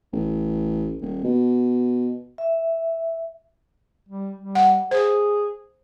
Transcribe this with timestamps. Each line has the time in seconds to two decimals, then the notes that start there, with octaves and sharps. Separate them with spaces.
0.13 A1
1.01 D#1
1.24 B2
2.38 E5
4.09 G3
4.37 G3
4.55 F#5
4.91 G#4 C5